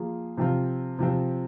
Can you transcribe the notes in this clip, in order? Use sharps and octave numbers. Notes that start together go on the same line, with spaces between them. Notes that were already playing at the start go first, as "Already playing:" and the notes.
Already playing: F3 A#3 F4 G#4
C3 F3 C4 F4
C3 F3 C4